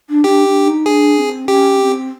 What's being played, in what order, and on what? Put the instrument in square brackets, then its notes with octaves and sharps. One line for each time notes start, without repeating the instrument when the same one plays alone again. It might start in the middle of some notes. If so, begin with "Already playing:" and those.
[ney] D4
[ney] D4 [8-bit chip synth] G4
[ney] D4
D#4
[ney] D4 [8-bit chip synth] G#4
[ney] C4
[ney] C#4 [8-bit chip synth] G4
[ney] C4